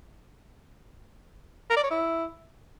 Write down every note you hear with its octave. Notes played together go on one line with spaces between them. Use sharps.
A#4
D5
C#5
E4